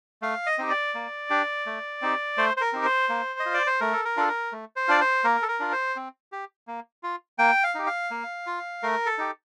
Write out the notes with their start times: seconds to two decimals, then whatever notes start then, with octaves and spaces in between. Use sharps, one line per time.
0.22 A3 F5
0.46 D#5
0.58 C4 D#4 G4
0.70 D5
0.94 A#3
1.30 D4 G4
1.66 A3
2.02 C4 D#4 G4
2.37 A3 C5
2.57 C5
2.61 A#4
2.73 C4 D#4 G4
2.85 C5
3.09 A#3
3.40 D#5
3.46 F4
3.54 D5
3.67 C5
3.80 A3 A#4
3.93 A4
4.05 A#4
4.17 D4 F4 A4
4.28 A#4
4.52 A3
4.76 C5
4.88 D4 F4 D5
5.01 C5
5.24 A#3 A#4
5.42 A4
5.48 A#4
5.60 D4 F4
5.72 C5
5.96 C4
6.32 G4
6.67 A#3
7.03 F4
7.39 A#3 G5
7.64 F5
7.75 D#4 G4
7.87 F5
8.11 A#3
8.47 F4
8.83 A3 A#4
9.06 A4
9.18 D#4 G4